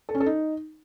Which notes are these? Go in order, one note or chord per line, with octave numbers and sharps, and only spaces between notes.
A4
C#4
A4
D#4